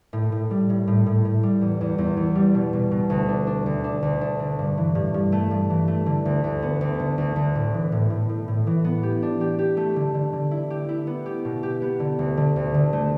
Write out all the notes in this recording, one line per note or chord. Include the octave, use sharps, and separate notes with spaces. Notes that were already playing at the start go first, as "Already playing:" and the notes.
A2
A2
G3
A2
A2
A2
A2
G3
E2
E2
E2
E2
G3
B2
B2
B2
D2
D4
D4
D2
D4
D2
D4
D3
G2
E3
G2
G2
A3
G2
E3
A3
D3
D2
D2
B3
D2
D3
D2
D2
A2
E3
A2
A2
A2
A2
E3
B3
G4
D4
G4
G4
A3
D3
D3
D3
E4
G4
E4
B3
G4
B2
G4
B3
D3
D2
D3
D2
D3
A3